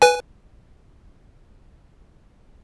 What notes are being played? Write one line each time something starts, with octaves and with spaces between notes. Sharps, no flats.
B4 G#5